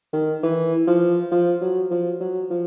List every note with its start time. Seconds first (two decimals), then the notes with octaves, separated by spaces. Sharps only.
0.13 D#3
0.43 E3
0.87 F3
1.32 F3
1.62 F#3
1.91 F3
2.21 F#3
2.50 F3